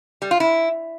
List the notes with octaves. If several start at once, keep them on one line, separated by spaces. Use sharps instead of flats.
G3
F4
E4